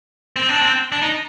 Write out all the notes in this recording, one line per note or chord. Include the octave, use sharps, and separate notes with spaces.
C4
D4
C4
D4
D#4